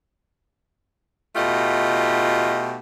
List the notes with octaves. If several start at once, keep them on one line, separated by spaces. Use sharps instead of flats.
B2 A3 D#4 F4 G4